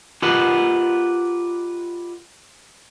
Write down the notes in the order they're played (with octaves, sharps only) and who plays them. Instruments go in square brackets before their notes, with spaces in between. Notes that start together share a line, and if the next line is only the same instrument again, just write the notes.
[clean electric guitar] F4 G4 A#4 B4 D#5 F#5